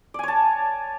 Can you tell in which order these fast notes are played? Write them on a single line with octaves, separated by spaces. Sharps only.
D5 G#5 C#5 A5